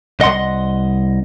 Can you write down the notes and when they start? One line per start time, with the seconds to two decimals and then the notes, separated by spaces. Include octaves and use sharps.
0.20 C2 D#5 F#5 C6